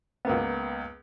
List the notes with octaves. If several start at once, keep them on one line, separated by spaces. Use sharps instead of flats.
C#2 A#3 B3